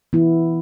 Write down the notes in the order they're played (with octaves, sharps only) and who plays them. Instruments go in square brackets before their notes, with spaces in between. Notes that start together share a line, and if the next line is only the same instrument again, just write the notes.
[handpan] E3 B3 E4